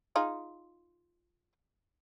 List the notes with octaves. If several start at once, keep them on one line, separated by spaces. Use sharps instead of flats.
D#4 F4 G#4